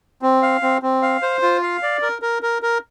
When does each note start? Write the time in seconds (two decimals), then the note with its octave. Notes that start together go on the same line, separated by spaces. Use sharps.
0.22 C4
0.42 F5
0.62 C4
0.82 C4
1.02 F5
1.22 C5
1.42 F4
1.62 F5
1.83 D5
2.02 A#4
2.22 A#4
2.43 A#4
2.62 A#4